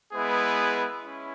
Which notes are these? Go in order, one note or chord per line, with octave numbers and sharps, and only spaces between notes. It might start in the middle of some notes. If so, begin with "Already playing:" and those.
G#3 B3 E4 G#4 B4
C#4 E4